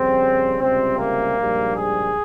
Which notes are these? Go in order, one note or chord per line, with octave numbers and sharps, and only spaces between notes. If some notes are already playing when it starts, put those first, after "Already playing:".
Already playing: F2 C#3 G3 C4
C#2 C3 G3 C4
A#3
A#1 G#2 G3
G#4